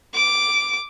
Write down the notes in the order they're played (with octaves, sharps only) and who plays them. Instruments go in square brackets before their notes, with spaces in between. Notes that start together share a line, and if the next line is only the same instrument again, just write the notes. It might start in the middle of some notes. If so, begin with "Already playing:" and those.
[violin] D6